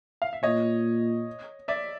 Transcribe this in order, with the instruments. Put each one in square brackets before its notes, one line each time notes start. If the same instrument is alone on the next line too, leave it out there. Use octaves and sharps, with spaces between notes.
[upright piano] F5
E5
[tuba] A#2 [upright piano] C#5 D#5
[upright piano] D5 E5